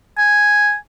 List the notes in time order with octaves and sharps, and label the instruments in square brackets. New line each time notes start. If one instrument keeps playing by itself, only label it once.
[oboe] G#5